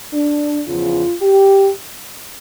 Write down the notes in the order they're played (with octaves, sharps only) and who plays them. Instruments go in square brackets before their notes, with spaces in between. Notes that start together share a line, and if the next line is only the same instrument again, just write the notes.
[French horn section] D4
E2 C#3 F3 F4
G4